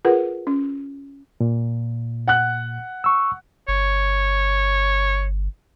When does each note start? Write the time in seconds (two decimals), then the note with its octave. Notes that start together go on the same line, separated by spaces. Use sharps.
0.05 F4 G#4 A#4 B4 F#5
0.47 C#4
1.40 A#2
2.28 F#5 F#6
3.04 C#6 E6
3.68 G1 C#5